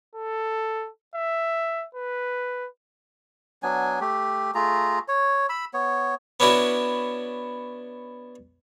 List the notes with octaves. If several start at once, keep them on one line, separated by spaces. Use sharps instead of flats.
A4
E5
B4
F#3 B3 D4 G#5
A3 G4
A3 F4 G#4 A#5
C#5
B5 E6
B3 C#5
B3 C#4 D4 E4 F#4